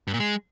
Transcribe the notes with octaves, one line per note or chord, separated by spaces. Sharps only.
G2
A#2
G#3